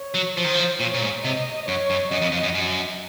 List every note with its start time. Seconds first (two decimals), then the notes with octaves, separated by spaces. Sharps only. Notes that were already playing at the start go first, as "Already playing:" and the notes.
Already playing: C#5
0.14 F#3
0.36 F3 C5
0.44 D#3
0.54 F3
0.80 A#2 C#5
0.94 A#2
1.02 G#2
1.24 C3 D#5
1.68 F#2 C#5
1.90 F#2
2.11 F#2 D#5
2.21 F2
2.32 F2
2.43 F#2
2.54 F#2